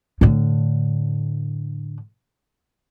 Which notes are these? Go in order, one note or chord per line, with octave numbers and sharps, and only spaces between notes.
A2 D3